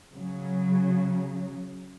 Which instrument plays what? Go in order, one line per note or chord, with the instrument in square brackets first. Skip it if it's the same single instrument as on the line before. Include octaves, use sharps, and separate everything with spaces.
[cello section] C#3 F#3